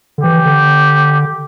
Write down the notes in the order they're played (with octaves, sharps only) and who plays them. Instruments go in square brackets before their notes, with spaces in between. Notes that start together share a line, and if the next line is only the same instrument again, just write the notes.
[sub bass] D3
[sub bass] E3 [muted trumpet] G4
[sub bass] D3